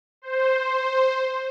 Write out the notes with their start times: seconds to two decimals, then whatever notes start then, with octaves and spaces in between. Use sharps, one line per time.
0.22 C5